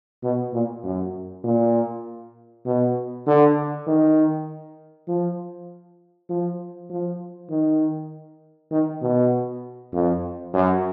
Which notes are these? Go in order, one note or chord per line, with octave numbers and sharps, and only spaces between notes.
B2
A#2
F#2
A#2
B2
D3
D#3
F3
F3
F3
D#3
D#3
B2
F2
F#2